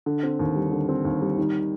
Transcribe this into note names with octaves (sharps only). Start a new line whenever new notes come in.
D3
C4
D#2
G3
D3
C4
D#2
G3
D#3